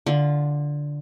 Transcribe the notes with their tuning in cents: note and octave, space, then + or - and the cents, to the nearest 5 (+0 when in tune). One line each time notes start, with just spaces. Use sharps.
D3 -5 F4 +0